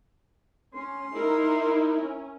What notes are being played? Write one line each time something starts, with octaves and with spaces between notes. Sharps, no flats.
C#4 C6
D#4 E4 A#4
C#4